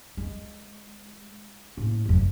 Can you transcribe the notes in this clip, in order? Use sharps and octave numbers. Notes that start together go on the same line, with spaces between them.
G#3
A2 A#3
F1 F#2